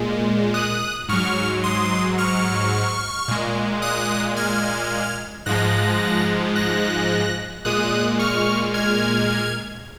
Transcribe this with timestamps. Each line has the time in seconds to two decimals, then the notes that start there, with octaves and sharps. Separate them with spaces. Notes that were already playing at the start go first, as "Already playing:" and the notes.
Already playing: A#2 G#3
0.54 D#6 F#6
1.09 G#2 F#3 C#6 F6
1.63 C6 D#6
2.18 C#6 F6
3.28 A#2 G#3
3.82 D#6 F#6
4.37 F6 G#6
5.46 G#2 F3 G#3 F#6 A#6
6.56 F#6 A#6
7.65 A#2 G#3 D#6 F#6
8.19 C#6 F6
8.74 F6 G#6